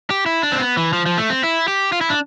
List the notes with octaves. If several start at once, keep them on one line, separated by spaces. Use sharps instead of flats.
G4
E4
D4
C4
B3
E3
F3
F3
A3
C4
E4
G4
F4
E4
D4